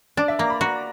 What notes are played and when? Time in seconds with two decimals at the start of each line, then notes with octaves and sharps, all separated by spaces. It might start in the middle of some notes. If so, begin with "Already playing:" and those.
0.17 D4 D5
0.28 E5
0.39 A#3 A#5
0.50 B5
0.61 F#4 A#5